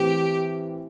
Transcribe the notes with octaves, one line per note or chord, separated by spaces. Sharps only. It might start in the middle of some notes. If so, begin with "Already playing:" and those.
Already playing: A2 E3 C4 G4